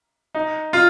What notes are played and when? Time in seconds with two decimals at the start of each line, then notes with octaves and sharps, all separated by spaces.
0.35 D#4
0.73 F4